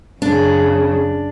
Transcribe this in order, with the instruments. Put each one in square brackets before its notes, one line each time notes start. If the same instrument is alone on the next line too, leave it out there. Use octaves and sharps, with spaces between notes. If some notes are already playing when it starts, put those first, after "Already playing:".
[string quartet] F#2 C#3 [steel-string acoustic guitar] D4